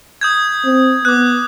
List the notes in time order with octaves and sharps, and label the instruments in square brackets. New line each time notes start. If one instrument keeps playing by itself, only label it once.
[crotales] D#6 G6 G#6
[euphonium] C4
[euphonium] B3 [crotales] D6 F#6